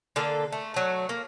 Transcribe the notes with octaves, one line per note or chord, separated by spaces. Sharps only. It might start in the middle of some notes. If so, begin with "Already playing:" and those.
D3 A#3 A4
A3
F#3 A3
A#3